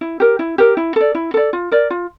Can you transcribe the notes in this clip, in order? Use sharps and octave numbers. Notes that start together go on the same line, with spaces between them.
E4
G4 A#4
E4
G4 A#4
E4
A4 D5
E4
A4 D5
F4
A#4 D5
F4